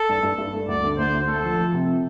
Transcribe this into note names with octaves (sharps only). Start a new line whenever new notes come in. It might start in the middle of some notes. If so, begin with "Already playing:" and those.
Already playing: A4
G2
G2
G2
A3
D2 D5
D3
D2 C5
D2
A3 A4
F3
F3
C3